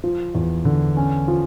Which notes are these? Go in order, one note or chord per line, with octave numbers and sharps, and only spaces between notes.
F3
E2
D3
C#4
F3